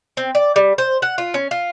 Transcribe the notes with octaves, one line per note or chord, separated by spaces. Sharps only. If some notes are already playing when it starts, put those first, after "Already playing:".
C4
D5
G3
C5
F#5
F4
C#4
F4